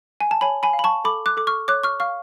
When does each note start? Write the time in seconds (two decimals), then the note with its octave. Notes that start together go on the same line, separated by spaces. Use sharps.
0.21 G#5
0.31 A5
0.41 C#5 G#5 B5
0.63 G#5 B5
0.73 F5
0.79 B5
0.84 A5 C#6
1.04 A4 B5 D6
1.26 D6 F#6
1.37 A4 D6
1.47 C#6 F6
1.68 C#5 D6 F#6
1.84 C#6 F6
2.00 F5 C#6 F6